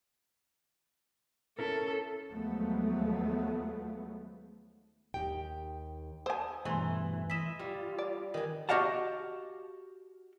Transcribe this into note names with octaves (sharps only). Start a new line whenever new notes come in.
C#4 E4 A4 A#4
D#2 F3 F#3 G#3 A3 B3
D#2 G#2 D#4 G4 G5
C5 G#5 A5 D#6 E6
G2 B2 E3 A3 G#5 A#5 C6
E3 E4 D#5 B6 E7
G3 F4
D5
D#3 B4 D#5 G#5
F#4 G4 D#5 F5 F#5 A5